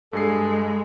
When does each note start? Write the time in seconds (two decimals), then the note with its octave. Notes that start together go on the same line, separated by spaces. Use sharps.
0.13 G2 G#3 G#4 A4 C7